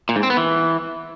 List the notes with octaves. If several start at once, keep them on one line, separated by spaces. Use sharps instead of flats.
A#2
G#2
C4
B3
E3